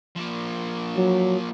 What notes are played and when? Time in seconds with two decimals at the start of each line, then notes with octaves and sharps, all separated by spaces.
0.15 F3 A#3
0.97 F#3